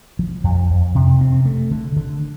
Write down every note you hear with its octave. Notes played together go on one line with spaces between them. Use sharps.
F3
F2
F2
C3
C4
A3
D3
D3